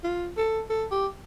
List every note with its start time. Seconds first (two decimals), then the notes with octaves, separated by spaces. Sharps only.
0.04 F4
0.37 A4
0.70 A4
0.91 G4